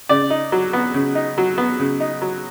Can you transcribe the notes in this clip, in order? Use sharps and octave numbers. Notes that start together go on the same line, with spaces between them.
C#3 D5
D#4
F#3
B3
C#3
D#4
F#3
B3
C#3
D#4
F#3